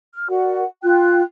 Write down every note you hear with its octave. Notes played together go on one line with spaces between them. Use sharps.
F6
F#4 A#4 D5 F#5
F4 G5 F#6